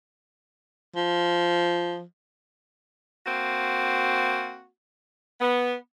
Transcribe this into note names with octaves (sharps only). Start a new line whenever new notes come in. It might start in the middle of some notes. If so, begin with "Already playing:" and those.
F3
A#3 C4 F#4
B3